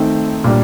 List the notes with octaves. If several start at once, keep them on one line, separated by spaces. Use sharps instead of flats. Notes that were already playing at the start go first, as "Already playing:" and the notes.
Already playing: D#3 A3 C4 D#4
A#2 G3 D4